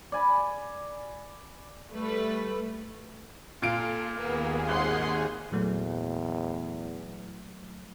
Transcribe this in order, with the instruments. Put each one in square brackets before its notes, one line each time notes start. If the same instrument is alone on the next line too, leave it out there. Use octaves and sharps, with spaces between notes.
[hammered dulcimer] D5 G#5 B5
[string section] G3 A3 B4
[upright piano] A#2 F5 D7 [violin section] F4 A4
[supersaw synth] D#2 G#4 [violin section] A#3 B3
[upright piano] G#1 [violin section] F#5 C6
[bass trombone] E2 [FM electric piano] A#2 F#3 A3